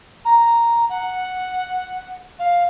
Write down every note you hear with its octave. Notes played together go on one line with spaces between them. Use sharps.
A#5
F#5
F5